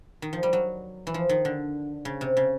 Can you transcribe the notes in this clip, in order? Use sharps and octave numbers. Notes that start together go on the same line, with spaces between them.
D#3
F3
G3
F#3
E3
F3
D#3
D3
C#3
C3
C#3